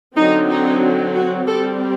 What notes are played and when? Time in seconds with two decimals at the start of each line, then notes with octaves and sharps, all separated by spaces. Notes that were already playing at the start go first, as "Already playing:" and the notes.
0.16 D3 F#3 C4 D#4
0.50 D#4
1.15 F#4
1.47 G3 C4 A4